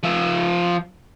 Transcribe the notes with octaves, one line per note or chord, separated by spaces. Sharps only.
F3 E5